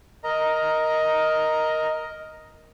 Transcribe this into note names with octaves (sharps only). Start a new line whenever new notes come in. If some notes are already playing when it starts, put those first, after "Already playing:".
A#4 D#5 A#5